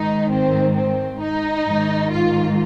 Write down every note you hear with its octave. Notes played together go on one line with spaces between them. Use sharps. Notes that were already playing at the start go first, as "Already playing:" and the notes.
Already playing: G#2 D#3 D#4
C4
C4
D#4
G#2 D#3
F4